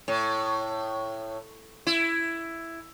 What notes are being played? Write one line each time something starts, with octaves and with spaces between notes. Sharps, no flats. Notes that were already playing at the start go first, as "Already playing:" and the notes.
A2
E4